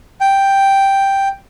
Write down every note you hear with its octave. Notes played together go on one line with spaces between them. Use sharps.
G5